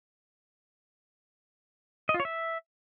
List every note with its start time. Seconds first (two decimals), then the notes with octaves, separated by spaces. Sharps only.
2.09 D#5
2.14 F4
2.20 C#5
2.25 E5